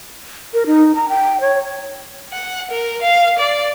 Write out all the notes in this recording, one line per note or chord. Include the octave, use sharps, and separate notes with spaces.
A#4
D#4
A#5
G5
C#5
F#5
A#4
F5
D5